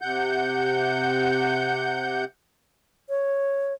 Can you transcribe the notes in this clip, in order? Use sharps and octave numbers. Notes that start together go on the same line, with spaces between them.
C3 F#5 G6
C#5